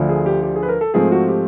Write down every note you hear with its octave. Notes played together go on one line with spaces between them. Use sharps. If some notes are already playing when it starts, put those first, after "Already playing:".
Already playing: D2 D3 F3
G#4
G4
G4
G#4
B4
A#4
A4
G#2 F3 A3 C4 G#4
F#4
G4